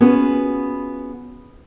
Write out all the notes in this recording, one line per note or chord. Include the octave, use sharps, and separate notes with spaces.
B3 C#4 F4 F#4 G#4 B4